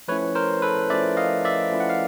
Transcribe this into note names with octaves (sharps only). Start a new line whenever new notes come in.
F3 A3 C#4 E4 B4 C#5
A#4 C5
A4 B4
F3 A3 C#4 E4 D5 E5
D#5 F5
D5 E5
F3 A3 C#4 E4
F#5
F5